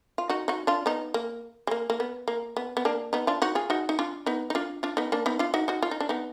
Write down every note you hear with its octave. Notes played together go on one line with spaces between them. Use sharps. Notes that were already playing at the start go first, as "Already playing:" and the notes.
F4
D#4 F#4
D#4 F#4
D4 F4
B3 D#4
A#3
G#3
A#3
A#3
B3
A#3
B3
B3
A#3 D4
B3 D#4
D4 F4
D#4 F#4
F4 G#4
D#4 F#4
D#4
D4 F4
B3 D#4
D#4
D4 F4
D4 F4
B3 D#4
A#3 D4
B3 D#4
D4 F4
D#4 F#4
D#4 F#4
F4
D#4
D4
B3 D#4